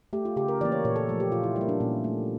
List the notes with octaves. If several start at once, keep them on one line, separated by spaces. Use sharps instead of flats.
A3 G4
F4
C#3 G4
A#4
E3 A#3 D5
C#5
A#2 C#5
A4
F3 A3
G4
A#2 F4
E4
G3 E4
A#3
D4
A#2 C#4
A3